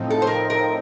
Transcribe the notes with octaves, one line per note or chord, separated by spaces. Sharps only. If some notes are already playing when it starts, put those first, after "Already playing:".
Already playing: A2 F3 C4 D#4
A4
C5
A#4
A#4